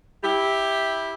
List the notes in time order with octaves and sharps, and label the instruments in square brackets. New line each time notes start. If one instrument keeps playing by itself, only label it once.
[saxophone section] E4 G4